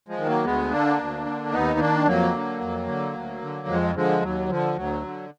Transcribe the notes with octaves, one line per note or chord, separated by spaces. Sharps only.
F3 G#3
D#3
F#3 A#3
D2 G#3 B3
D3 A#3 D4
D2
D3
D#2 B3 D#4
D#3 A#3 D4
F2 F#3 A#3
D3
F2
D3
D2
D3
F2 F3 G#3
D3 F3 G#3
D#2 F#3
D3 F3
D2 F#3
D3